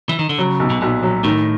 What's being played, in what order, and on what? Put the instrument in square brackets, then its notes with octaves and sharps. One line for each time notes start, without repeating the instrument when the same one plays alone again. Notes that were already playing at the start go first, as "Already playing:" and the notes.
[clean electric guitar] E3
D#3
D3
[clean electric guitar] C#3 [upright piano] F#3
[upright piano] B1
[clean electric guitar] B2
[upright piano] B1 [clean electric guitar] A#2
[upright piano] F#3
[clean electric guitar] A2 [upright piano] D#3